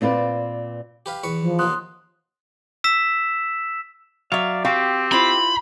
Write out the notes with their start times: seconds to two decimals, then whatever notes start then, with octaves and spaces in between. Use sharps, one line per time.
0.01 A#2 C4 F4 B4 D5
1.06 G4 B4 F5
1.24 E2 B4 C#6
1.41 F3
1.59 D#2 A#3 B3 C6 D#6 F#6
2.84 E6 B6 E7
4.32 F#3 D5 E5 F5
4.65 C4 F#4 G4 F5 G5
5.12 E4 F4 C5 B5